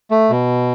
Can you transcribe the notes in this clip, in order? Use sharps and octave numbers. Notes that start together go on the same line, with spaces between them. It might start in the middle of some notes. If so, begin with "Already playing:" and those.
A3
B2